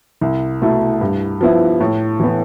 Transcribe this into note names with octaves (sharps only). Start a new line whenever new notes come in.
C2
B2 A3 E4
G2
F3 B3 E4
A2
E3 B3